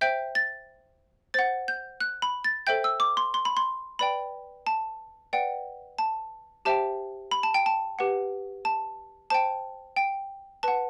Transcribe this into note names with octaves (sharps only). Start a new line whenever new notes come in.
C5 E5 G5 G6
A6
C5 F#5 A6
G6
F#6
B5
A6
A4 C5 E5 G5 G6
E6
D6
C6
C6
B5
C6
B4 D5 G5 B5
A5
B4 D5 F#5 G5
A5
G4 C5 E5 G5 A5
B5
A5
G5
A5
G4 B4 F#5
A5
C5 G5 A5
G5
B4 F#5 A5